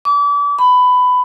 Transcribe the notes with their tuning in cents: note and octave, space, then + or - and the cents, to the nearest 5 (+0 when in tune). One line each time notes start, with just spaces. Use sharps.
D6 -35
B5 +15